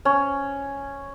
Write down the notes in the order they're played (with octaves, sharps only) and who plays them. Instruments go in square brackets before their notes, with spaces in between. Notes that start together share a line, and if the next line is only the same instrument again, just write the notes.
[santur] C#4